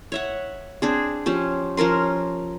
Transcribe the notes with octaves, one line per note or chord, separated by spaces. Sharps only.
C#5 E5 F#5
C4 D4 G#4
F3 C#4 G4
F3 C#4 A#4 C6